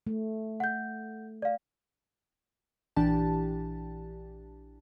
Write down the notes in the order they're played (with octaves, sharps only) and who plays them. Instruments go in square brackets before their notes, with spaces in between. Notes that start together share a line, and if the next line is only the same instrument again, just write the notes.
[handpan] A3
[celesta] F#5 G6
D5 F5
[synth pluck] A#1 E3 D4 G4 A5